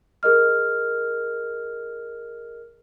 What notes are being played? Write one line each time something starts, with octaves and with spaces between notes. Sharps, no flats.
G#4 A#4 D#5 F6